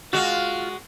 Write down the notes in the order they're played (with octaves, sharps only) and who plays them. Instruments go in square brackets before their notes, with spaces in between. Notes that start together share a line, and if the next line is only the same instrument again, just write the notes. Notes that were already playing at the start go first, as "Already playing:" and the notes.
[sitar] G#3 F#4 [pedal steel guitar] F4 F5